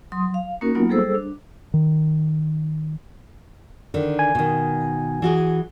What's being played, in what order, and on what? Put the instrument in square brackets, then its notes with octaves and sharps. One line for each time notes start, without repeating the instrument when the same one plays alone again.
[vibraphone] F#3 C6 D#6
F5
A#3 C#4 D#4 F#4 A#4
F#3 A#3 B3 D#4 F4
G3 G#4 A4 C5 E6
D4
[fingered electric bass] D#3
[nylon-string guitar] D3 D#3
[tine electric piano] G#5
[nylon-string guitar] B2 D#3
E3 F#4 G#4